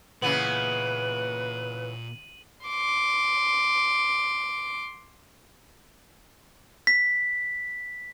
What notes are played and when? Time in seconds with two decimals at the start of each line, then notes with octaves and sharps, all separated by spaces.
0.22 A#2 C#3 E3 B3 B4 D#7 F#7
2.66 C6 D6
6.87 B6